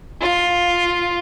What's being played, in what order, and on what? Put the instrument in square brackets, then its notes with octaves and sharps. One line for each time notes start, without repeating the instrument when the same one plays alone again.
[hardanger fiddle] F4